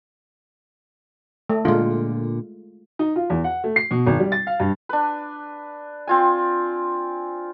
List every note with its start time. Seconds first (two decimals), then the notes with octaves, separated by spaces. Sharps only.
1.50 A3
1.65 A#2 D3 G#3 F4
2.99 D#4
3.16 F4
3.30 E2
3.44 F#5
3.64 A3
3.76 C7
3.91 B2
4.06 G#1
4.20 G3
4.32 A6
4.47 F5
4.60 G2
4.89 D4 B4
6.07 C4 F4 G#5